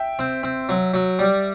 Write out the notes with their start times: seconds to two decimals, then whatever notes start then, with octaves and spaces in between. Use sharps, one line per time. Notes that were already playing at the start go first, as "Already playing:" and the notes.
Already playing: E5 G5
0.19 C4
0.43 C4
0.69 F#3
0.94 F#3
1.19 G3